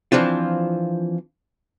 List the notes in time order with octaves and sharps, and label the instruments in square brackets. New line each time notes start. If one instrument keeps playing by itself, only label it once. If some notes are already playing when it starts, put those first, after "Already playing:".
[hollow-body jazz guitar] E3 F3 C4 D4 F4